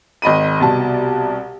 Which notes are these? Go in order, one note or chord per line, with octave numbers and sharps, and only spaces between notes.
G#1 D#5 B5 D#7
C2 B2 A5